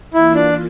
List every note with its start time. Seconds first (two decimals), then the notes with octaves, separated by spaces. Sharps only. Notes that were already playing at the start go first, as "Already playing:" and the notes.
0.14 E3 A#3 E4 F4
0.35 D4